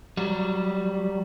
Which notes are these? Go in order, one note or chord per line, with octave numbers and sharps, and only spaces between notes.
F#3 G3